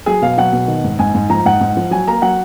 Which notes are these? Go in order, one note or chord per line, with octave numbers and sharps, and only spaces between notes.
F#3 G#4
B2 F5
F#3 F#5
B2
D#3
G#2
G#2 G#5
G#2
F3 A#5
G#2 F#5
G#2
F3
F#3 G#5
A#3 A#5
F#3 F#5